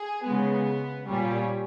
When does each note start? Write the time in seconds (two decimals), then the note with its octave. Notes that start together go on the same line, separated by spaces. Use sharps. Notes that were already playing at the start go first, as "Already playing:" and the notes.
Already playing: G#4
0.25 C#3 G#3 B3
1.07 A#2 G3 C#4